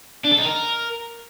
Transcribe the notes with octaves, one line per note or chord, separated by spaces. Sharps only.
D4
A4
D#4
A#4